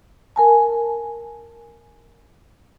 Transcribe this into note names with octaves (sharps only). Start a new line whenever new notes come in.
A#4 G#5 A5